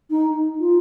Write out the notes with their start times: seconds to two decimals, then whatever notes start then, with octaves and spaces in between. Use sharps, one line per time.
0.10 D#4
0.60 F4